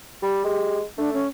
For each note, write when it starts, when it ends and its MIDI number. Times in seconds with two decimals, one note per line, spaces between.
0.22 0.42 55
0.22 0.79 67
0.44 0.83 56
0.98 1.24 57
0.98 1.13 62
1.13 1.28 61